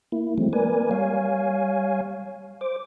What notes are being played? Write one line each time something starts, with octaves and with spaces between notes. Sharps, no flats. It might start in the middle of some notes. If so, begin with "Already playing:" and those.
A#3 E4
E3 F#3 G#3 A3 C4
A#3 A#4 B4 D5 G#5
G3 C#5 F5 G#5
C5 D6